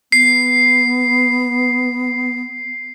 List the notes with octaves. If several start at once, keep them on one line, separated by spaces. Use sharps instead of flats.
B3 C7